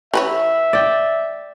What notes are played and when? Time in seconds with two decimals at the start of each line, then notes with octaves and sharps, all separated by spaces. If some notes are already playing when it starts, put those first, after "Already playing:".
0.14 E3 B4 C#5 E5
0.73 D5 G5